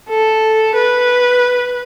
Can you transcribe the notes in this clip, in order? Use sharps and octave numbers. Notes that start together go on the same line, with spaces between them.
A4
B4